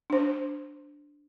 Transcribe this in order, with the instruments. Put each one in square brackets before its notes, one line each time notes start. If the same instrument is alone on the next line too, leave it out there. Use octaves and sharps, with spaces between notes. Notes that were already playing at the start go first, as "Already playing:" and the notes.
[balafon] D4 C5